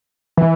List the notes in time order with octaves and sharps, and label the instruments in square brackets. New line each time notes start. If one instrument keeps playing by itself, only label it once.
[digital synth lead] E3